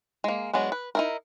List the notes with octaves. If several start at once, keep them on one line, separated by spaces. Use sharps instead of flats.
G#3 A#3
F#3 G#3 B3 D4
B4
D#4 E4 A#4